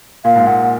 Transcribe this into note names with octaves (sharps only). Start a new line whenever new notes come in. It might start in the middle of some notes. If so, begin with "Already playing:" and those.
A#2 F5
G#2
A#2 F#5